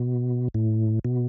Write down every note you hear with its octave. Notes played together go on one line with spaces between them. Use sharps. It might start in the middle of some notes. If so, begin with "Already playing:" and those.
Already playing: B2
A2
B2